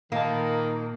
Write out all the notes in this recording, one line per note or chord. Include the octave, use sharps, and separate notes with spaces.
A#2 D#3 A#3 A5